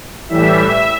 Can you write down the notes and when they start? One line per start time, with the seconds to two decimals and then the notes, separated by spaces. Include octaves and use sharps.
0.29 A2 E3 G3 E5